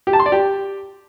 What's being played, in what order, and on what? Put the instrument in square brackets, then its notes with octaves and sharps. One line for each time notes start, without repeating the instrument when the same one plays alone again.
[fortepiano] G4
A5
C6
D5
G4